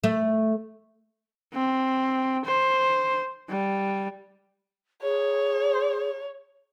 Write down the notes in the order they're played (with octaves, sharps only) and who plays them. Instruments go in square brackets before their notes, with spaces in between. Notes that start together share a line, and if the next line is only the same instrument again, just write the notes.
[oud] A3
[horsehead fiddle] C4
C5
G3
[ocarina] G#4 [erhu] C#5